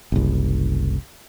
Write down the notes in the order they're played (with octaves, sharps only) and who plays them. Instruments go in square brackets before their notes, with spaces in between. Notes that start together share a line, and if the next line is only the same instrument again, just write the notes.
[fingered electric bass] F#1 C2